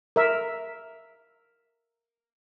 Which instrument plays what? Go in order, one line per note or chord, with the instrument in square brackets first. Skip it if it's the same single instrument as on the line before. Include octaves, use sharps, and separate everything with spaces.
[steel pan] A#4 E5